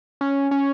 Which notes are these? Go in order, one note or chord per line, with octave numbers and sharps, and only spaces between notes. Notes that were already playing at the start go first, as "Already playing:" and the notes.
C#4
C#4